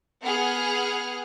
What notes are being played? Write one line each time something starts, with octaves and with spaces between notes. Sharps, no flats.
B3 G#4 F#5 F6